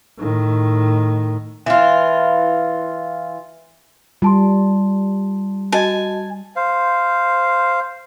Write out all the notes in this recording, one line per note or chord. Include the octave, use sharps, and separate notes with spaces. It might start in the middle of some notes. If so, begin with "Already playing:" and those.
A2 D#3
E3 F4
G3 F4 A5 C6
F#4 D#5 G#5 A5
C5 F5